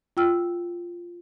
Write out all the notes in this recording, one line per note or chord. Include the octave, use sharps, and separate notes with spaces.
F4 G5 E6 F6